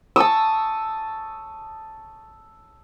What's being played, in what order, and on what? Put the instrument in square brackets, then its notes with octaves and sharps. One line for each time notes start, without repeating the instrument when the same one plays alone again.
[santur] A5 C#6 D#6 E6